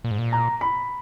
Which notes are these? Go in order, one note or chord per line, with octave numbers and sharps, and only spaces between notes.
A#2
G#2
A#2
A#5
B5